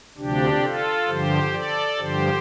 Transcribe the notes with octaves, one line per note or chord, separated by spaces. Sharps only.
D2 C3 F3 D4 G4
F4 A4
G2 D3 F3 G4 C5
A4 D5
G2 D3 F3 G4 C5